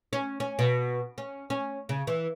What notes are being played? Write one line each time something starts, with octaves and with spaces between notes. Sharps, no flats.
C#4
C#4
B2
C#4
C#4
C#3
E3